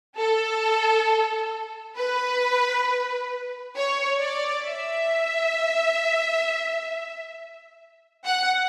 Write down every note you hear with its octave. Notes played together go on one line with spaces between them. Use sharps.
A4
B4
C#5
D5
E5
F#5